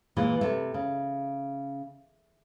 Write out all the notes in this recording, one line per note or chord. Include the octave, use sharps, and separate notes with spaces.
A#2 E3 G#3
C3 A3
C#3